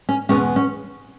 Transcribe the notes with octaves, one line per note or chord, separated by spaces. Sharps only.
C#4
E2 B2 G#3 B3 C#4
C#4